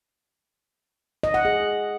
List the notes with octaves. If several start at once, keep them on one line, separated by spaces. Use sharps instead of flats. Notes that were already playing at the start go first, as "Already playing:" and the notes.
D#5
F#5
G#4